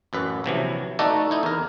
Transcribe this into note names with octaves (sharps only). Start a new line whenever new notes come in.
A1 F#2 B4
A#1 C3 E3 F#3
A3 D#4 F#4 A4 D5 D#5
D#4 E4
E2 A#4